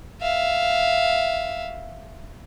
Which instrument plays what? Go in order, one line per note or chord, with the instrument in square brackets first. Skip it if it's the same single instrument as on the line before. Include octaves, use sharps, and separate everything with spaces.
[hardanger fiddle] E5 F5